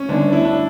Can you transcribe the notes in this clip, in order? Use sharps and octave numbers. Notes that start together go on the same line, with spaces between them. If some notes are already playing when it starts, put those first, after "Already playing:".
Already playing: C#4
D3 G3 B3 D4 D#4
E4
D4